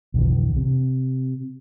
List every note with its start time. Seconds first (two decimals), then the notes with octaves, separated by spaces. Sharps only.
0.14 B1 F2 D3 E3
0.56 C3